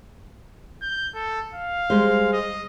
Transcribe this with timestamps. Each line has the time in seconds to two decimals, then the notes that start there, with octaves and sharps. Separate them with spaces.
0.82 G6
1.15 A4
1.54 F5
1.90 G3 G#3 C5
2.33 D#5